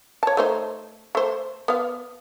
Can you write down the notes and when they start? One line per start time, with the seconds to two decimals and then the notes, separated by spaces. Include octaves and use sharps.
0.23 C#5 A5
0.37 A3 D#4 C5
1.15 A3 C5
1.68 B3 F5